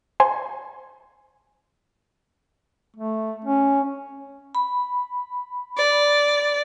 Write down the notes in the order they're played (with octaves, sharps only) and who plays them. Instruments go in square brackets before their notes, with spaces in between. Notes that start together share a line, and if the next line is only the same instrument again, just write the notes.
[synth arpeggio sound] C5 G#5 C6
[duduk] A3
C#4
[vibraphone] B5
[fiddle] D5